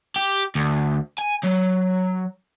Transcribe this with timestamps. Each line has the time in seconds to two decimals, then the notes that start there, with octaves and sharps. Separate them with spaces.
0.16 G4
0.55 D2
1.19 G#5
1.44 F#3